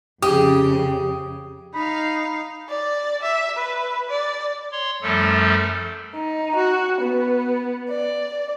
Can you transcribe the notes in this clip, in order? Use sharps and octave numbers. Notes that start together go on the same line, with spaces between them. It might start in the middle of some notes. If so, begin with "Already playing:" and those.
F2 C#3 G4 G#4 D#6
D#4 F5 B5
D5
E5
B4
D5
C#5 C6
F#2 F3 G3 A3 A4
D#4
F#4
B3
D5